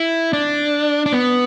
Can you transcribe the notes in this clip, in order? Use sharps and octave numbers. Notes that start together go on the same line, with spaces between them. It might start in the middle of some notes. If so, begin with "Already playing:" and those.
Already playing: E4
D4
D4
B3